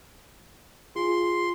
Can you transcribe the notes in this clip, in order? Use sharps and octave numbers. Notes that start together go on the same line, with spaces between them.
F4 G#4 C6